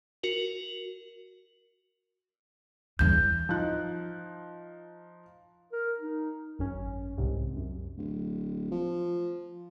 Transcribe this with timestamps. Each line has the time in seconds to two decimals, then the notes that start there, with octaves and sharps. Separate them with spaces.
0.23 F#4 A#4 F#7
2.99 E2 G2 G6
3.49 F3 D#4 F#6
5.72 A#4
5.99 D#4
6.59 G#1 F#2 C#4
7.18 C2 G#2 C3
7.56 F#2
7.98 D1
8.72 F3